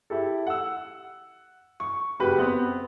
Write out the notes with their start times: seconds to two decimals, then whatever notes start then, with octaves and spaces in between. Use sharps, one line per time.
0.10 E4 G4 A4
0.46 F#5 E6
1.80 C#6
2.20 F#1 F#4 G4 B4
2.38 B3 C4